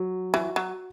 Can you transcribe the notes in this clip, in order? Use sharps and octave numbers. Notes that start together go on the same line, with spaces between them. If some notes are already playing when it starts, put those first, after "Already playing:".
Already playing: F#3
E3 F#4
F#3